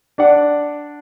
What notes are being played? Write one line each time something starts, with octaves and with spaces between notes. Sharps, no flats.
D4 D5 F#5